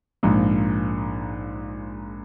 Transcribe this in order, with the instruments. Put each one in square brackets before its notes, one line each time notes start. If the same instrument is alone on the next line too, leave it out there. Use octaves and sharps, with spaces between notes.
[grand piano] A#1 G#2 F3